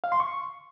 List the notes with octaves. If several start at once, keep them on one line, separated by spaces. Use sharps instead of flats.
F5
C6
C#6